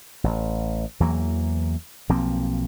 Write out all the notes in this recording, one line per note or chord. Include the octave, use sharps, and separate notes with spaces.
A1
E2 E3 F#3 A#3
B1 F3 A#3 C4